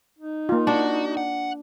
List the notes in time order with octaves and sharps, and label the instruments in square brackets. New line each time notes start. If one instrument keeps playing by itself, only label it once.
[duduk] D#4
[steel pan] A#3 F4
[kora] D4 [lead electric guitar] F#4
[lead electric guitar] F#5